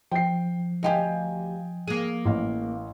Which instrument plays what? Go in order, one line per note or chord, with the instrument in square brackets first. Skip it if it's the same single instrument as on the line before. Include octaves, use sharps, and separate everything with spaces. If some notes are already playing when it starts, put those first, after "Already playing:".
[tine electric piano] F3 [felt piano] G5 C7
[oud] D2 F4 G4 [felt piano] D#5 G5 G#5
[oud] A#3 G#4
[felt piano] A1 F5